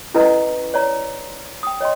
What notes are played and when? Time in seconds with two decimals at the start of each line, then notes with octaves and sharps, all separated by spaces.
0.14 C#4 E4 A4 B4 D#5 A#5
0.74 C#5 D5 A#5
1.63 G5 D#6
1.81 C#5 D#5 G5 C6